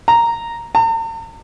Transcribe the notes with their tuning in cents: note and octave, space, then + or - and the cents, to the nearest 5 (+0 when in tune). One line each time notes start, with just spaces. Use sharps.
A#5 -5
A#5 -45